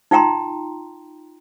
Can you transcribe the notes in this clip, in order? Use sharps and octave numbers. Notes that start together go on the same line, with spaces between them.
D#4 F4 G5 A#5 C6